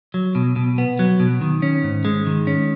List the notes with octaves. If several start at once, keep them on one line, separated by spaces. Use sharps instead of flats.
F#3
B2
B2
B3
F#3
B2
D#3
C#4
G#2
G#3
D#3
C#4